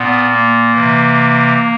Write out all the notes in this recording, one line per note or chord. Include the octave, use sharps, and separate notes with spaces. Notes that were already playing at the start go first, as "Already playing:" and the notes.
Already playing: A#2 B3
A#3
C3 E3